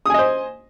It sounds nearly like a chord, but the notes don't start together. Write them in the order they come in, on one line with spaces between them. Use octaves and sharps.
D#6 G#5 D#5 C5